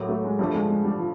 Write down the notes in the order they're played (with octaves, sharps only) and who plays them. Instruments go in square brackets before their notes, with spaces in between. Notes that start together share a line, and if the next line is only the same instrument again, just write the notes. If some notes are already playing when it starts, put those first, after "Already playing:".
Already playing: [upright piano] A2 F#3 A#3
[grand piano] A3
G#3
[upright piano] G2 D3 F3 A3 [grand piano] G3
[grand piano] G#3
G#3
G3
F3